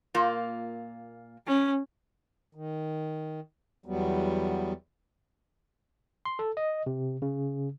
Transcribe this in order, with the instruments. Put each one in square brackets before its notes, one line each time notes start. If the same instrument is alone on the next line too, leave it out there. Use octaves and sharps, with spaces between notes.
[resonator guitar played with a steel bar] A#2 A#3 F4
[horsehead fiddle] C#4
[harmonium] D#3
E2 F#3 G3 B3
[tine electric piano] C6
A4
D#5
C3
C#3